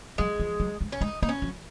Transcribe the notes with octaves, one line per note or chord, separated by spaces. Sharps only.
F#3 G#3
F3
F#3
G#3
C#4
G#3 D#4
A#3 D#4
C#4
F#3